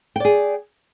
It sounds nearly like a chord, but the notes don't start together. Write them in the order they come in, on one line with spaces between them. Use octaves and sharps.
G5 D5 G#4